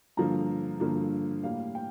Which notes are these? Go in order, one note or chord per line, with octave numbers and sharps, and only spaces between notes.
G2 D3 F3 A#3 A#5
G2 D3 F3 A#3
A2 G3 A#3 F5
G5